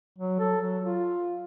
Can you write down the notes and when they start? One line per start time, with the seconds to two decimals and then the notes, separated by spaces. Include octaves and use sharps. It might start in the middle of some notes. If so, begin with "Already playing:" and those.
0.18 F#3
0.39 A4
0.61 F#3
0.82 F4